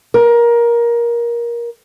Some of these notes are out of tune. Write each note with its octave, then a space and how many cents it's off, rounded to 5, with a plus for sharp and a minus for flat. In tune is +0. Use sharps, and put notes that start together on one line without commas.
A#4 +20